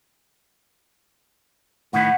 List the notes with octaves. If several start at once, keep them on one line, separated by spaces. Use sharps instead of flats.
A2 D#3 E4 F#5